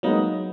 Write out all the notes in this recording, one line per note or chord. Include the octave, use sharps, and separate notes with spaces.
F#3 G#3 A#3 B3 D#4